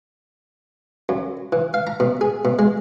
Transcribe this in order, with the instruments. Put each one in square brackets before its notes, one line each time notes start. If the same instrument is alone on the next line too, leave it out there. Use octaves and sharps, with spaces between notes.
[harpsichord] F#2
E3
F5
A#5
B2
G#4
B2
G#3